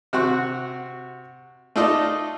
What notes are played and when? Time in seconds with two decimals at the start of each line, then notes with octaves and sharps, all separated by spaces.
0.13 C3 F#4 F#5 C#6
1.76 A3 D#4 F4 A4 D5 D#5